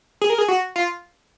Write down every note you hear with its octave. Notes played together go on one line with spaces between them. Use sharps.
G#4
A#4
G#4
F#4
F4